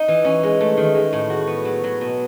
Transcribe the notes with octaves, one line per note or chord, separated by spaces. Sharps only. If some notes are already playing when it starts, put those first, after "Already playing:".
Already playing: D#4
E3
C#4
G#3
A3
D#3
G#3
A2
F#4
B3
F#3
F#3
B2